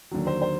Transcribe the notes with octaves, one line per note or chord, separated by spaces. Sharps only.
D#2 D3 F#3
C5
C5